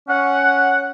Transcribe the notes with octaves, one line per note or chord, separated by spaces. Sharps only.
C#4 F#5